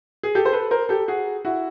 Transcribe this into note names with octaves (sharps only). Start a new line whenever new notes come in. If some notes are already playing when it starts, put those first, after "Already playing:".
G#4
G4 A4
C5
A4 B4
A#4 C5
G4 A4
F#4 G#4
E4 F#4